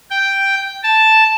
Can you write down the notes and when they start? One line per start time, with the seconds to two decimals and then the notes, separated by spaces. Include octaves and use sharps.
0.11 G5
0.83 A5